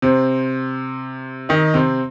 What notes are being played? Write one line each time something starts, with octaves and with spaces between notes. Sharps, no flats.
C3 C4
D#3 D#4
C3 C4